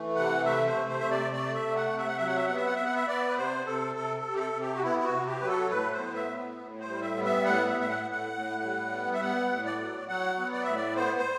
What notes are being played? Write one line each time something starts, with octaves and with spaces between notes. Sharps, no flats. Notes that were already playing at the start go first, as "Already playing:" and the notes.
Already playing: E3 A3
C3 F#5
A3 E5
C5
C3
C5
C3 E5
D5
A3 D5
E5
C3
F#5
C3
E5
F#5
F#3 E5
F#5
E5
B3 F#5
E5
F#5
B3 E5
F#5
E5
B3 D5
B4
C3 C5
C3 A4
C3 A4
A4
C3
G4
A4
C3
G4
F#4
B3 E4
E4
F#4
C3
G4
F#3 B4
A4
A2 B4
C5
B3
E5
A2
A2
C5
G3
E5
B3
E5
A2 F#5
E5
A2
E5
F#5
A2
F#5
A2
G3
B3
E5
B3 F#5
A2
D5
F#3
F#3 F#5
B3
D5
A2 E5
D5
B3 C5
C5